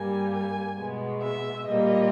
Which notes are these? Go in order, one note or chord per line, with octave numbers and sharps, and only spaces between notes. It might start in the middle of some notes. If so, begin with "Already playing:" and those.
Already playing: G2 G3 A#3 G#5
G#5
B2 G#3 B3
E5
A#2 G3 A#3 D#5